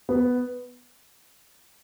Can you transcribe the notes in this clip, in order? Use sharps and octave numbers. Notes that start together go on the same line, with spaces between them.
B3